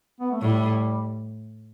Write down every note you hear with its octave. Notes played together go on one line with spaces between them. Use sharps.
B3
A3
A2 G3